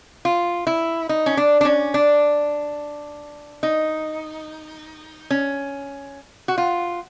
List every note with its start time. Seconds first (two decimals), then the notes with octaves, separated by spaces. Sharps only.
0.25 F4
0.67 E4
1.09 D#4
1.26 C#4
1.37 D4
1.61 D4
1.65 C#4
1.94 D4
3.63 D#4
5.30 C#4
6.48 F#4
6.58 F4